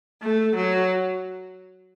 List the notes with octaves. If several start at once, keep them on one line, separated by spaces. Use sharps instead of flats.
A3
F#3